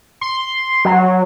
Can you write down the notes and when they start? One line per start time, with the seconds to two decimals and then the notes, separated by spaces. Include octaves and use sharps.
0.21 C6
0.85 F#3